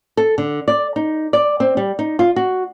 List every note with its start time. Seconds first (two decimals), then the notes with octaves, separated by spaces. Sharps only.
0.17 A4
0.38 D3
0.68 D5
0.96 D#4
1.33 D5
1.60 C4
1.77 G3
1.99 D#4
2.19 F4
2.36 F#4